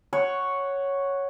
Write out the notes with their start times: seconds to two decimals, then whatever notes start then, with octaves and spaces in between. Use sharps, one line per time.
0.13 C#5 F#5 C#6